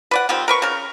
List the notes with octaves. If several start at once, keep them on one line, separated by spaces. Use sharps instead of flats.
B4 D5 F#5
D#3 F3 G3 C4
A#4 B4 C#6
C#3 A#4